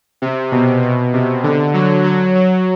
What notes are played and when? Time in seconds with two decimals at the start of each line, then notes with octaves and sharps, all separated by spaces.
0.22 C3
0.52 B2
0.82 B2
1.13 C3
1.44 D3
1.74 F#3
2.04 F#3
2.35 F#3